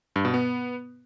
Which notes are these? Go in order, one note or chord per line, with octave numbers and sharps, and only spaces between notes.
G2
B2
B3